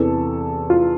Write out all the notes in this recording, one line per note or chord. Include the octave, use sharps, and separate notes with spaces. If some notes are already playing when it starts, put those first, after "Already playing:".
Already playing: E2 C3 E3 A4
F4